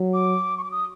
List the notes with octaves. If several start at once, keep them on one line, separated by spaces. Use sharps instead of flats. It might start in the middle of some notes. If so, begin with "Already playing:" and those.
Already playing: F#3
D6
C#6
D6
D#6